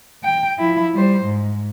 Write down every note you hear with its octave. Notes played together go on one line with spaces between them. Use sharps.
G5
F3 E4
G3 C5
G#2